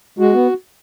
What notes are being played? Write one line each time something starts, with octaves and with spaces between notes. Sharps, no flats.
G#3 F#4
B3